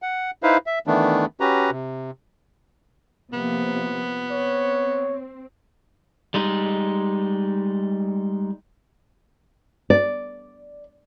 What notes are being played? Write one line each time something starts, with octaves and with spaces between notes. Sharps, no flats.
F#5
D#4 E4 B4 C5 F5
E5
D#3 E3 A3 B3 D4
C#4 F#4 G4 B4 A#5
C3
C3 F3 A#3 B3
C4 C#5
G3 G#3 D#4
D5